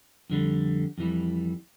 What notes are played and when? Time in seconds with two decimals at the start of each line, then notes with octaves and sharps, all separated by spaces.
0.30 F2 D3 G3
0.98 F2 E3 G3